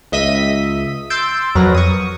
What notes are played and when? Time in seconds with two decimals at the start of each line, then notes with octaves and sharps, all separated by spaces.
0.12 C#2 D#5 E5 B6 D#7
1.10 C6 E6 G6 A6 D7
1.55 F2 F#3 A#4 B4 A#6
1.75 C#6 D#6